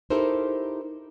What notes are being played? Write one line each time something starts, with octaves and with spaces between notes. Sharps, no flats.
D#4 E4 G4 A4 A#4 C5